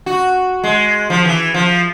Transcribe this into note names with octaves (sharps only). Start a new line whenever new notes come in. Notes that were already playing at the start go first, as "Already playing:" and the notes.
F#4
G#3
F3
E3
F3